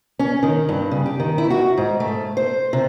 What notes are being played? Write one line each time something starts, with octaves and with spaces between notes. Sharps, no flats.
C#4
D#3
G2
C#3
G4
D#3
E4
F#4
G#2
A3
C5
C3